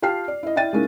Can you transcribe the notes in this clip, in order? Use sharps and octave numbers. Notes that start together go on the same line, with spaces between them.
F4 G4 G5 A5 F6 C7
D5
E4 D#5
E4 D5 E5 G5 A6 D#7
G#3 A#3 C#4 D#4 E4